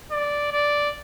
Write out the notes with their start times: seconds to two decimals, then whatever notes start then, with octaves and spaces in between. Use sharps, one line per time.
0.11 D5
0.52 D5